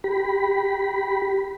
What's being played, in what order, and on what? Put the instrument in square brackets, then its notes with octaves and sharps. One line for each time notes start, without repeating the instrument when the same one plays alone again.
[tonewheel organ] G4 B5